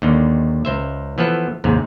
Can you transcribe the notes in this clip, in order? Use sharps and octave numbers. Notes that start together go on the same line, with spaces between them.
D#2 D3 D#3
C#2 C5 E5
E3 F3 B3 A4
D#2 G#2 C3